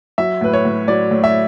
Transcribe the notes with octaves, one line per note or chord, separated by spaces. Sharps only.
F#3 E5
A2 B4
C#5
A2
F#3 D5
A2
E5